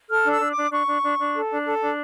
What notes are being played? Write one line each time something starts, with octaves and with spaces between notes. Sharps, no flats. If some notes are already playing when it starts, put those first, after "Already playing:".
A4 F6
D4 E6
D4
D6
D4
D4 C#6
D4
D4
D4
A4
D4
A4
D4